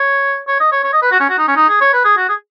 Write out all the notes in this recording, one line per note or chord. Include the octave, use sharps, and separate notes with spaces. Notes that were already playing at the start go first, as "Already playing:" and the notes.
Already playing: C#5
C#5
D#5
C#5
C#5
D#5
B4
F#4
C#4
F#4
D#4
C#4
D#4
G#4
C#5
B4
G#4
F#4
G#4